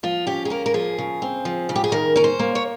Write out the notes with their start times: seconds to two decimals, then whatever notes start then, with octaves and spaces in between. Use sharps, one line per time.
0.03 F3 F4
0.27 C#4 G4
0.45 G#4
0.50 A#3 A#4
0.66 A#4
0.74 F3 G#4
0.98 C#3
1.22 C4
1.45 F3
1.69 C#3
1.76 G4
1.84 G#4
1.92 D#3 A#4
2.16 C#4 A#4
2.24 C5
2.39 A#3
2.55 C#5